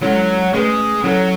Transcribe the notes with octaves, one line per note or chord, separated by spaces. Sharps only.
F#3 G#3 C#4 E4 A4
G#3 A3 C#4 G#4 B4
F#3 C#4 E4 A4 C#5